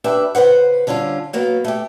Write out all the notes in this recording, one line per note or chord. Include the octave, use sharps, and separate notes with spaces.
D4 G4 B4 E5
C#3 B4 C5 F#5
D3 G3 C#4 D4 F4
F#3 A#3 B3
A3 G4